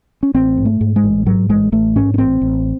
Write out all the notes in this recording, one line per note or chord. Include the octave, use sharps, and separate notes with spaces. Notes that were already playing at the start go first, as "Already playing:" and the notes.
C#4
A1 C4
G#2
A3
G#2
G#3
A1
G#2 F#3
A1 G#3
A1 A3
G#2 C#4
C#4
A1 C4
A1